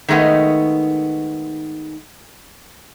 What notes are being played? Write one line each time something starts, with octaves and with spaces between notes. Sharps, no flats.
D#3 G#3 A3 B3 D#4